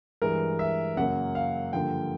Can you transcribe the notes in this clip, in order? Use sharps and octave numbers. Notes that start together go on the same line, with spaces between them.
G2 E3 G#3 A#4
E5
F#2 C#3 F#3 A#3 F#5
F5
G2 D3 F3 A#3 G5